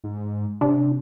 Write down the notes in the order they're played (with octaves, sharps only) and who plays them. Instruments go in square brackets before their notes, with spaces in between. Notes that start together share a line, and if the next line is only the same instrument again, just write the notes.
[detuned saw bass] G#2
[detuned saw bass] C3 [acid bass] D4